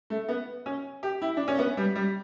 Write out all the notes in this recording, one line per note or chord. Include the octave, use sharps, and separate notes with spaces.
A3
B3
C#4
G4
E4
D4
C#4
B3
G3
G3